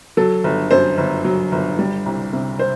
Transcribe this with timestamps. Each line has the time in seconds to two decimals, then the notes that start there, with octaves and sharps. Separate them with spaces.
0.17 F#3 A4
0.44 G1
0.71 F#2 C5
0.98 G1
1.25 F#3
1.52 G1
1.79 G3
2.06 C2
2.33 C3
2.59 C5